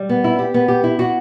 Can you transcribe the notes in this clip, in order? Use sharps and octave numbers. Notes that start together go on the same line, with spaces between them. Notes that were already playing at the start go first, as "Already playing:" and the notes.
Already playing: G3
B3
E4
G4
B3
G4
E4
F#4